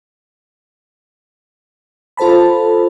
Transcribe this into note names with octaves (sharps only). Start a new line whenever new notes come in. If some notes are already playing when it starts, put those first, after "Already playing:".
F4 A4 C5 A5 B5